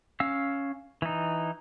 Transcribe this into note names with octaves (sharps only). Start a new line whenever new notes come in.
C#4 F5 E6
E3 D#4